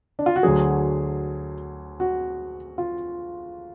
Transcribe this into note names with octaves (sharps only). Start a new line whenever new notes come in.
D4
F4
F#4
D2 D3 F#3 G#4
F#4
F4